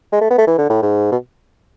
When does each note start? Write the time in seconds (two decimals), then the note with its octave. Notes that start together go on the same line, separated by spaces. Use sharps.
0.12 G#3
0.21 A3
0.31 B3
0.38 A3
0.47 E3
0.58 D3
0.69 A2
0.82 G#2
1.12 B2